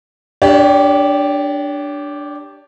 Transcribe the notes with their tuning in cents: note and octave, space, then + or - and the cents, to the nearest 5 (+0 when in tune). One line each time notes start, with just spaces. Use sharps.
D4 +0 G4 +0 C#5 +40